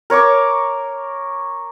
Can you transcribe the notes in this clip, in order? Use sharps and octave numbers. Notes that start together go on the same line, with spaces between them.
A#4 C#5 C#6 D6